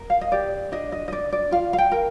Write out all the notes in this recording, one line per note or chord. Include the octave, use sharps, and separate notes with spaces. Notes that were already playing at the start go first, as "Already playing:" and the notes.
Already playing: A#4
F5
D#5
G4 D5
D4 D#5
D#5
D#5
D4 D5
D5
F4 F5
F5
G5
A#4